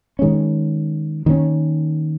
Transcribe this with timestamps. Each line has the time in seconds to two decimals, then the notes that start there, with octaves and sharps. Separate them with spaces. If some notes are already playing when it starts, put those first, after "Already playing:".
0.19 D#3 G#3 C#4
1.26 D#3 A#3 C#4